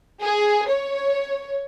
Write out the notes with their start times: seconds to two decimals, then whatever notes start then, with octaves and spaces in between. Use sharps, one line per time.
0.21 G#4
0.68 C#5